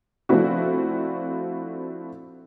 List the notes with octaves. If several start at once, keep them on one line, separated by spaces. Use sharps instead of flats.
F3 A3 C4 D4 E4 F#4